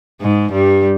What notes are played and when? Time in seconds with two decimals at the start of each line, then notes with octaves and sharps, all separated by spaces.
0.21 G#2 G#3
0.52 G2 G3